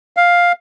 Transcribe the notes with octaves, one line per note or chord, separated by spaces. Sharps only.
F5